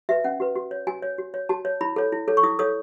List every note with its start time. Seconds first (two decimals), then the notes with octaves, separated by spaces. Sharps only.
0.09 F#4 B4 E5
0.24 C#4 F#5
0.40 F#4 B4
0.55 F#4
0.71 C#5
0.87 F#4 G#5
1.03 C#5
1.18 F#4
1.34 C#5
1.49 F#4 A5
1.65 C#5
1.81 E4 B5
1.96 A4 C#5
2.12 E4
2.28 A4 C#5
2.37 C#6
2.43 E4 D#6
2.59 A4 C#5 D#6